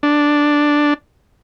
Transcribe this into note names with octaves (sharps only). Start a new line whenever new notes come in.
D4